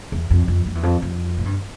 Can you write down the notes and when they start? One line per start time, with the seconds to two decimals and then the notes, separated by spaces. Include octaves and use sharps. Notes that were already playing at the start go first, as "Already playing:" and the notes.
0.12 E2
0.30 F2
0.48 F2
0.66 F2
0.75 E2
0.83 F2
1.02 F2
1.38 A2
1.45 G2